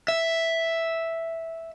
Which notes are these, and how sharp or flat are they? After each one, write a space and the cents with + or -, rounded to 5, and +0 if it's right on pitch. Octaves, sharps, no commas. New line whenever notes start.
E5 +0